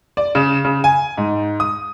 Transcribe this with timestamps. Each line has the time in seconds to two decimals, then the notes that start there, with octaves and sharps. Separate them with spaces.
0.17 D5
0.35 C#3
0.65 C#3
0.84 G#5
1.18 G#2
1.60 D#6